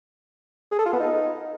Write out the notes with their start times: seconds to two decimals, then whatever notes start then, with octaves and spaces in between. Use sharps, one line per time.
0.71 G#4
0.78 A4
0.86 F4
0.93 B3
1.00 D#4